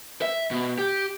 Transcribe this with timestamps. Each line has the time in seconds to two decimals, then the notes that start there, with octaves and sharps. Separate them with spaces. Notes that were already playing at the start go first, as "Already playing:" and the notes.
0.22 E5
0.51 B2
0.78 G4